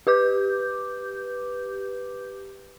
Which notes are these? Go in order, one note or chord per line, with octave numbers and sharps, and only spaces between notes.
G4 B4 D6 G6